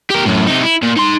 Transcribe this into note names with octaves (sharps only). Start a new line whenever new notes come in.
G4 A#4
F#2 A2
C3 D#4
E4
A#2
D#4 C6